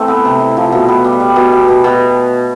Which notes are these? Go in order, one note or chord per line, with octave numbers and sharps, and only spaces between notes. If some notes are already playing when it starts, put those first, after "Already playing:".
Already playing: E3 A3 C4
B3
C3
E4
F3
B2
B3
G3
G3
B2
B2
B2
B2